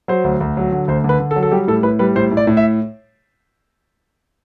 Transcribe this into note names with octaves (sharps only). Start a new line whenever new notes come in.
F#3 C5
D2
D2
F#3
D3
D2 C5
D3
B4
D3
A4
F#3
A4
G3 G4
A2 A4
A2 B4
G3 B4
A2 C5
A2
D5
A2
E5